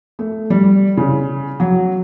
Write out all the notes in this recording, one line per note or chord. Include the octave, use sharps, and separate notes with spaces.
A3
G3
C#3
F#3